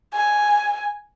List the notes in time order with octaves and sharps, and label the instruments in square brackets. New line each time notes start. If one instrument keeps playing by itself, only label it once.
[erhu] G#5